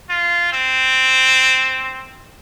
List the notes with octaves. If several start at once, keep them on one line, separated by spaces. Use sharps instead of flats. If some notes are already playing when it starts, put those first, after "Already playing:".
F4
C4